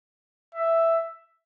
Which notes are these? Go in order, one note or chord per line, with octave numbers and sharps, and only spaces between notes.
E5